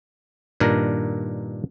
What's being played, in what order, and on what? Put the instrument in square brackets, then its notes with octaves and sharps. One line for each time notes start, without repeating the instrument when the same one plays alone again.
[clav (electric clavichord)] G2 A#2 D#3 D4 A#4